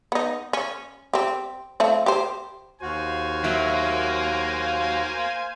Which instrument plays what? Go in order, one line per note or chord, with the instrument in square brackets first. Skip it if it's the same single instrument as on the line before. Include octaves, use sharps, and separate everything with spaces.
[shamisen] B3 D#4
C#4
C4 G4
F3 A3 C4
G4 C5
[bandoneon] D#2 F#4 [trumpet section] C5 F5 G#5
[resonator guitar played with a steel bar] F#3 E5 [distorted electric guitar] A#3